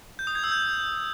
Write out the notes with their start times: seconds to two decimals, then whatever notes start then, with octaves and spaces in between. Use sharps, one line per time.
0.19 G6
0.27 D#6
0.35 G#6
0.44 E6
0.52 G6